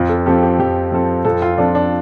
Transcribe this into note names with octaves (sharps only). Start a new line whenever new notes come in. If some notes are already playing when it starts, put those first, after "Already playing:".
Already playing: F2 F4
A4
F3 C4 G4 A4
G4
F2 G4
F3 C4 A4
F2 A4
F4
F3 C4 D4 A4
D4